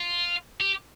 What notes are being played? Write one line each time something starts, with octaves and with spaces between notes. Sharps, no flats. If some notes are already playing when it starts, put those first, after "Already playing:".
Already playing: F4
G4